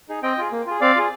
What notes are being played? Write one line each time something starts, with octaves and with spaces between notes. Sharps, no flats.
D#4 G#4
C4 D#5 G5
F4 G#4
A#3
F4 G#4
C4 D5 F5
F4 G#4